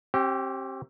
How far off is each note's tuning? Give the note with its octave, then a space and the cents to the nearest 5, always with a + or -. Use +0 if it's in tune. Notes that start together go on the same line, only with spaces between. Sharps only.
C4 +35 G4 -20